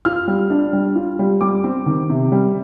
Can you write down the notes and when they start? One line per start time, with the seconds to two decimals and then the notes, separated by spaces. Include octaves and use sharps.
0.05 F4 F6
0.28 G3
0.50 D4
0.73 G3
0.95 F4
1.19 G3
1.41 G3 D6
1.64 C4
1.86 D#3
2.10 C3
2.32 G3